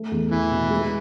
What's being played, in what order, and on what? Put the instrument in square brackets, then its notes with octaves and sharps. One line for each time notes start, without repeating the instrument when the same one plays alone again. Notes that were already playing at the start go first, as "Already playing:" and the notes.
Already playing: [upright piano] A3
E2
[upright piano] E2 [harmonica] E3
[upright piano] B2
G#3